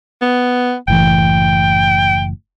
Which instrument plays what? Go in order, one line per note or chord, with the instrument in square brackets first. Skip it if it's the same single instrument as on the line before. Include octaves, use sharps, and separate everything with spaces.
[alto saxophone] B3
[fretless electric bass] F#1 A2 E3 [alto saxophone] G5